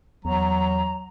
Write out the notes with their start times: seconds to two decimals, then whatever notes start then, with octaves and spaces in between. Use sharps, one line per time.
0.25 E2 F#3 A#5